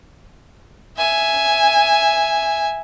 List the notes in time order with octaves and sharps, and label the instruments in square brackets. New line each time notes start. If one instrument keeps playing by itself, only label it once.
[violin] E5 G#5